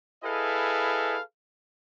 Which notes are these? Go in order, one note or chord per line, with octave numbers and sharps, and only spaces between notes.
E4 G#4 A4 B4 D#5 F5